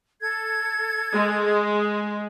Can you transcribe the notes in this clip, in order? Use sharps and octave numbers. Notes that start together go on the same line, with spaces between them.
A4 G#6
G#3 G#4